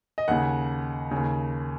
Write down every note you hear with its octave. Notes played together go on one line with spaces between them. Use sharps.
D#5
D#2 C#3 F#5
D#2 C#3